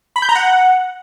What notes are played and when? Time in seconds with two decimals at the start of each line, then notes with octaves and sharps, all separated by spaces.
0.16 B5
0.22 G6
0.29 A#5
0.35 F#5